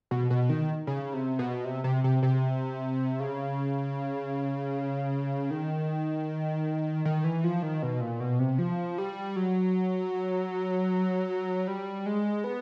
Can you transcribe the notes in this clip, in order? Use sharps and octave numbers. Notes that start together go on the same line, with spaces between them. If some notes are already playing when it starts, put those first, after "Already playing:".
B2
B2
D#3
C#3
C3
B2
C3
C3
C3
C3
C#3
D#3
D#3
E3
F3
D#3
B2
A#2
B2
C3
F3
G3
F#3
G3
G#3
B3